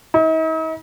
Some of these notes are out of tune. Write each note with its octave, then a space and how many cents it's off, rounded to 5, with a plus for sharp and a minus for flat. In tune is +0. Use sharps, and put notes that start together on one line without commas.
D#4 +45